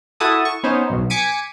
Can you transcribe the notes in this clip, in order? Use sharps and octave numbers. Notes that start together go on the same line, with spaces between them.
E4 F#4 A4 A5 D#6
C#6
B3 C#4 D#4 C5
B1 B2
G#5 D6 B6 C#7 D#7